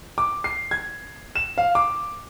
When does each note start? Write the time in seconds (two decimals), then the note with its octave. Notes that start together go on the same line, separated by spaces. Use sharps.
0.18 D6
0.44 C7
0.71 G#6
1.36 E7
1.58 F5
1.75 D6